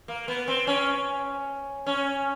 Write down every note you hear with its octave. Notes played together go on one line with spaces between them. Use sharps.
A#3
B3
C4
C#4
C#4